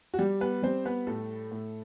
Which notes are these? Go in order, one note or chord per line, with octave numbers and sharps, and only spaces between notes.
F#4
G3 G4
B3 B4
G3 C4 C5
B3 B4
A2 A3 A4
A2